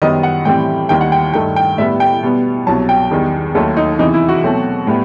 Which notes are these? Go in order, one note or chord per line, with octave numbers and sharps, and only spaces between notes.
F#2 D#3 G3 B3 D#5
F#5
A2 E3 G3 C4 G5
D#2 D#3 G3 G5
F#5
G5
G2 D#3 A3 G5
G5
A2 G3 B3 E5
G5
B2 G3 B3
C2 B2 F#3 A5
G5
E2 D#3 G3
D#2 D#3 F#3 A3 A4
D#4
E2 C3 E3 D#4
E4
F#4
B2 F#3 A3 C4
A2 G3 B3